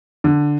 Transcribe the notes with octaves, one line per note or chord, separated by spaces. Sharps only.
D3